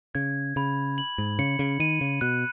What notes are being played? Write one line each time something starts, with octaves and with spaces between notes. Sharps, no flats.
C#3 G#6
C#3 B5
F#7
G#2
C#3 C#7
C#3
D#3 D#7
C#3
B2 F#6